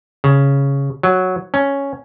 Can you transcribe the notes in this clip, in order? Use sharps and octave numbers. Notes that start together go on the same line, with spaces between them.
C#3
F#3
C#4